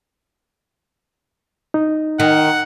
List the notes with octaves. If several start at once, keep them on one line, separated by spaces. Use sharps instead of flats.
D#4
D#3 F#5